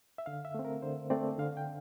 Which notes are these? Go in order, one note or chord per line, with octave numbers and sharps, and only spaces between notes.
E5
D3 F5
E5
A3 C4
A#4
D3 C5
A3 C4 D5
D3 F5
G5